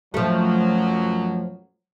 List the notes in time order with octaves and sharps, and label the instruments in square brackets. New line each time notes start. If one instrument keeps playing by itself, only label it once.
[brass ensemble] F#2 B2 F#3 [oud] F3 A3